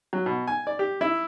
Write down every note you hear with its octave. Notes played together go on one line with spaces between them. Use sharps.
F#3
B2
G#5
D5
G4
E4